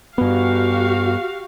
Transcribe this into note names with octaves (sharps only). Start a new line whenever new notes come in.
G2 B3 F#4 G4 F5